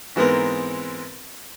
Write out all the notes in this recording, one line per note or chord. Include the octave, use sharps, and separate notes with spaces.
G#2 E3 G#3 B3 C4 A#4